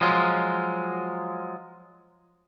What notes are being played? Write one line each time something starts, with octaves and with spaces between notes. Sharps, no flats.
F3 F#3 G#3 F4